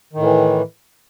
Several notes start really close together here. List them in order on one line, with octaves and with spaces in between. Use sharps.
D#3 A2 E3